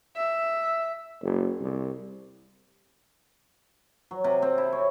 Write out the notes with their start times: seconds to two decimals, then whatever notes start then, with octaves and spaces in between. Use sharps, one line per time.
0.16 E5
1.23 F#1
1.61 C2
4.11 F#3
4.24 C3
4.42 C4
4.58 E4
4.73 C#5